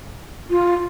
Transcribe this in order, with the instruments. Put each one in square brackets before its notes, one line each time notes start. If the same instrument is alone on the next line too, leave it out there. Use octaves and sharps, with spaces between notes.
[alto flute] F4